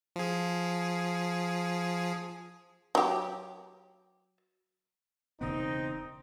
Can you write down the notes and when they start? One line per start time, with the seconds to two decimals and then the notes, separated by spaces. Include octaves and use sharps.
0.16 F3 G#4
2.95 F#3 G4
5.41 E1 C#3 B3 C4 D#4